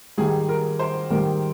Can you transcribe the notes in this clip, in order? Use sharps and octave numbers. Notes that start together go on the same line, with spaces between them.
G#2 D#3 G3 G#4
A#4
C5
G#2 D#3 G3 A#4